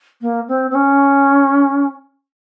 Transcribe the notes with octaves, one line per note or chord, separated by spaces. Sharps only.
A#3
C4
C4
C#4